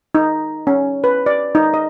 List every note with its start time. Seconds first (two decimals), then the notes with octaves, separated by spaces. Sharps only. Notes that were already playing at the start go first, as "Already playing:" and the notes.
0.15 D#4
0.67 C#4
1.04 B4
1.26 D5
1.55 D#4
1.74 D#5